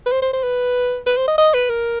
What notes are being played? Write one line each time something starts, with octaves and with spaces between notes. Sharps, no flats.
B4
C5
C5
C5
B4
B4
C5
D#5
D#5
B4
A#4